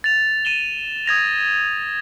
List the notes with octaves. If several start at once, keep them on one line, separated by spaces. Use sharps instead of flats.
A6 F7
D#7 E7 G7
D#6 G#6 A#6 F7